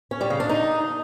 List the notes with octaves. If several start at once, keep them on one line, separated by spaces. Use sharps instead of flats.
C#4
G3
C#3
D4
D#4